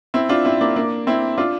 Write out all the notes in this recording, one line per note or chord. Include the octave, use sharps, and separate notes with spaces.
C4 E4
D4 F4
C4 E4
A#3 D4
A#3 D4
C4 E4
D4 F4